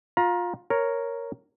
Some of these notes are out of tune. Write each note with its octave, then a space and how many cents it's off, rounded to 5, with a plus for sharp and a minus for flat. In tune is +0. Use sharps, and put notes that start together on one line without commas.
F4 +20 A#5 +25
A#4 +0 C#5 +0